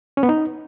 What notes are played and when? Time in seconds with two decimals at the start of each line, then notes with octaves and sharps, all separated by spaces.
0.17 C#4
0.23 B3
0.29 D#4